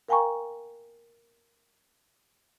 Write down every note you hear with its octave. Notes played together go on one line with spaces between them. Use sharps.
A#4 F5 G5 G#5 A#5 C#6